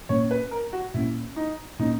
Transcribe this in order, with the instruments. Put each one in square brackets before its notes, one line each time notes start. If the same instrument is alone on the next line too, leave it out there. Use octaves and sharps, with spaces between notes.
[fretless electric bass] A#2 A#3 C#4 [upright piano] C#5
[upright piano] B4
A#4
F#4
[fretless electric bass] A#2 A#3 C#4 [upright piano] E4
[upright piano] D#4
[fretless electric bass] A#2 A#3 C#4 [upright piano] D#4